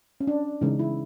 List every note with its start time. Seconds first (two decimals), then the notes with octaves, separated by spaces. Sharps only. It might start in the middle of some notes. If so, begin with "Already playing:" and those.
0.20 C#4
0.27 D4
0.61 C#3 E3 G#3 C#4 D#4
0.79 E4